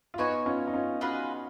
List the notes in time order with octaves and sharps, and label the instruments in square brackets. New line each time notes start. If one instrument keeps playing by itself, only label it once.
[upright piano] F4
[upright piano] B3 D#4 [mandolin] F#4 C#5 G#5
[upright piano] C#4 F4
D#4
C#4 F4
[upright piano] D#4 F#4 [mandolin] F4 G#4 B4 D#5